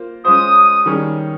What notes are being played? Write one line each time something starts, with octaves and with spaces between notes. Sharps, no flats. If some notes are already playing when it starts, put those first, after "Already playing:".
Already playing: A#3 F4 C5
G#3 C#4 F4 C5 D#6
D#3 G3 C#4 G#4